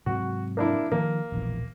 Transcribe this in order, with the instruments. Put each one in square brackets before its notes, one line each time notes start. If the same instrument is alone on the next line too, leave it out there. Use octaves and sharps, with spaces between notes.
[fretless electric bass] G#2 C3 F#3 [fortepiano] F#4
[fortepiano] A#3 D4 E4
[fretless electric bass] D#3 F3 [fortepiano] A#3
[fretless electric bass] E1 A#1 E3